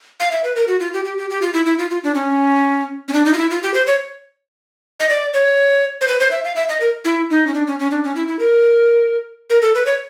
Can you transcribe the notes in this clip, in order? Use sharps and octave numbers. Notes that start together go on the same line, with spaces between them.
F5
E5
B4
A#4
F#4
F4
G4
G4
G4
G4
F4
E4
E4
F4
F4
D4
C#4
C#4
D4
D#4
F4
E4
F4
G4
C5
C#5
D#5
D5
C#5
C5
B4
C5
E5
F5
E5
D#5
A#4
E4
D#4
C#4
D4
C#4
C#4
D4
C#4
E4
E4
A#4
A#4
A4
B4
C#5